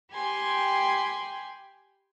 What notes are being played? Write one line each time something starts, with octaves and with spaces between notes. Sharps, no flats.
G4 G5 G#5 B5 C6